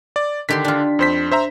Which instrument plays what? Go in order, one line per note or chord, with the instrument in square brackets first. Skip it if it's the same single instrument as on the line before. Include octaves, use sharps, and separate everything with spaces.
[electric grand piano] D5
[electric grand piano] D3 B6 [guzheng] D#3 G4 C6
[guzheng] D4 F4
[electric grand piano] F2 C5 B6
C5 E5 A#5